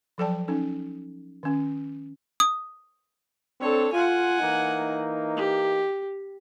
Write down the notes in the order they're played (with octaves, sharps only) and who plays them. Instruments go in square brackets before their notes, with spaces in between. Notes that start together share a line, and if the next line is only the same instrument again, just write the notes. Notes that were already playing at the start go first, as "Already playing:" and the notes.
[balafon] F3 F#3 A4 D5 G5 A5
C#4 D#4 A4
D#3 C#4
[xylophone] D#6
[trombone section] C4 D4 [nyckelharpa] A4 C#5
[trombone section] F4 [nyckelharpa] F#5 G#5
[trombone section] E3 A#3 D#4
[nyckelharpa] G4